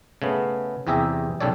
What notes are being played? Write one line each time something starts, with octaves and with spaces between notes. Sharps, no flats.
C#3 A3 B3
E2 C3 G4 G#4 E5 A#5
B1 C#3 G4 A4 C#5 D5